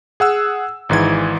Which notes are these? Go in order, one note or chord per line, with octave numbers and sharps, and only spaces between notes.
G#4 F#5 E6
G#1 G#2 E3 G#6